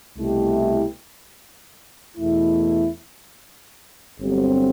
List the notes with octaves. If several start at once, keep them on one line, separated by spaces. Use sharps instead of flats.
C2 B2 A3 E4 G4
E2 B2 A3 E4
G1 G2 F#3 C4